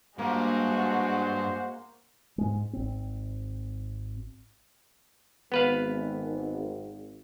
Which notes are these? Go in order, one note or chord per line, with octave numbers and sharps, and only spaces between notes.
G2 G#3 A#3 F#4 C5
G#2 G#3
G#1 C4
G#1 B3 B4 F5